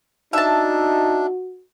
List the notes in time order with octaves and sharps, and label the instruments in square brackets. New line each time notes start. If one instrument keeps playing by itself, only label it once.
[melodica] D4 [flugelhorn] D#4 [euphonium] F#4 [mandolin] E5 A5